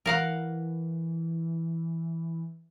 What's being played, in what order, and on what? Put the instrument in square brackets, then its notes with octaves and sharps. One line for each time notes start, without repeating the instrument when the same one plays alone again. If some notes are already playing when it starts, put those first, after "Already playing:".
[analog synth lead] E3 [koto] A#4 F5 F#5